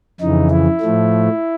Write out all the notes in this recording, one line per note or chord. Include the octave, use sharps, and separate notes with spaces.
F2 C#3 E3 D#4
E4
A2 F3 A3